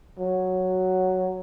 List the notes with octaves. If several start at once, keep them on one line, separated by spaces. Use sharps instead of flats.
F#3